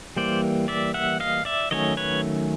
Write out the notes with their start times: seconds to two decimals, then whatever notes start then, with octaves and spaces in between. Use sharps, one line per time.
0.17 E3 G3 A#3 C5 D5
0.68 D5 E5
0.94 E5 F#5
1.20 D#5 F5
1.45 D5 E5
1.71 D#3 F#3 A3 C#4 C#5 D#5
1.97 B4 C#5